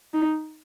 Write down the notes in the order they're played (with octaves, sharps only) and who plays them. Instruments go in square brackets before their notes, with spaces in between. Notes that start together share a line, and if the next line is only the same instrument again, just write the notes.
[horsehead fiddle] D#4